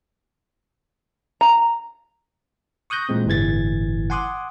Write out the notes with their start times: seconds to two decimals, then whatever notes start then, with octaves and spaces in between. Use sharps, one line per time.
1.41 A#5
2.90 C#6 D#6 F#6 G6 A#6
3.09 A#2 E3 G#3 C4
3.26 G1 A2 E3 G#6 A6
4.10 F#5 G#5 C6 D6 D#6 F#6